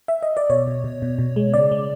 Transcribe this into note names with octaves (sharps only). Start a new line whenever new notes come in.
E5
D#5
D5
B2 C#5
B2
B2
B2
B2
G#3
C#3 D5
G#3